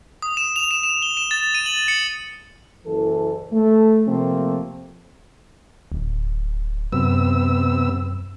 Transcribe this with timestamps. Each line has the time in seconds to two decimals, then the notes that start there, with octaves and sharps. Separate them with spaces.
0.22 D#6
0.37 E7
0.56 F7
0.71 E7
0.83 E7
1.02 G7
1.17 E7
1.31 A6
1.55 D#7
1.66 F#7
1.88 C#7
2.85 F#1 E3 A4
3.52 A3
4.06 C3 F3 A3 A#3 C4
5.92 D1
6.92 F#2 C3 B3 E6